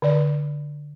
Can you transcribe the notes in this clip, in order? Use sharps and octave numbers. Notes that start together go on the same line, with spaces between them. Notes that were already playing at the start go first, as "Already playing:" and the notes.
D3 D5